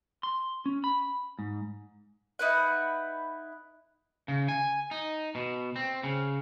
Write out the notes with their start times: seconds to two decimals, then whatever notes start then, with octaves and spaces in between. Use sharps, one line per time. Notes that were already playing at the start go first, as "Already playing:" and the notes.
0.23 C6
0.66 C#4
0.84 B5
1.39 G#2
2.39 D#4 E4 B4 F#5
4.28 C#3
4.48 G#5
4.91 D#4
5.35 B2
5.76 C4
6.03 C#3